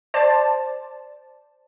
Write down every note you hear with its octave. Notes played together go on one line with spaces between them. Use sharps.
C5 D5 A5